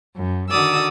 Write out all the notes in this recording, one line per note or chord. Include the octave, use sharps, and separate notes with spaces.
F#2
D3 D#3 F#4 D5 D#6 E6